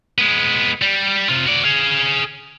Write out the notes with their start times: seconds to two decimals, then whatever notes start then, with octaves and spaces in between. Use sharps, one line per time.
0.18 G#3 B3
0.82 G3
1.29 C3 F4
1.46 F#4 D5
1.64 G#4 F5